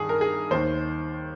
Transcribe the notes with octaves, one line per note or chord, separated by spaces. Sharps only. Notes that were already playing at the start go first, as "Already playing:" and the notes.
Already playing: G2 D#3 G#4
A#4
G#4
D#2 D#3 C5